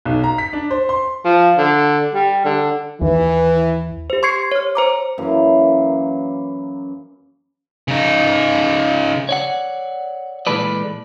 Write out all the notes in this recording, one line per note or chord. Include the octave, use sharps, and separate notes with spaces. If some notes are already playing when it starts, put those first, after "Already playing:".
B1
A#5
B6
D4
C5
C6
F3
D3
G3
D3
D#2 E3
G4 C5
C6 C#6 G#6 C7 C#7
C#5 F6
C5 A#5 D6
F#2 E3 A#3 F5
C#3 D#4
C#5 D5 F#5
A#2 E3 G#3 A4 B4 D5